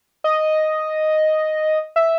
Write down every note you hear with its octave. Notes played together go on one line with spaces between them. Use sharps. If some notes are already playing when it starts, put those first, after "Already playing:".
D#5
E5